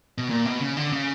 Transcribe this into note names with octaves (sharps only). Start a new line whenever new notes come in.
B2
A#2
B2
C#3
D3
C#3